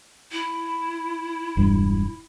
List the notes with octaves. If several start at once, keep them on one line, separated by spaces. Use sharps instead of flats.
E4
E1 G2